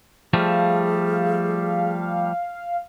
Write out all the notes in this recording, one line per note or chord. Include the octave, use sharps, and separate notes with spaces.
F3 G3 A3 G#4 F5